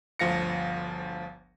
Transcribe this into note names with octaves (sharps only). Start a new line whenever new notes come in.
G1 D2 F3 F5 A#6 C#7